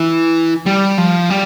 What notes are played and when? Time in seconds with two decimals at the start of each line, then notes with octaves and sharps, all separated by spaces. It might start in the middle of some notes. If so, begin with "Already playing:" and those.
Already playing: E3
0.66 G3
0.98 F3
1.30 G3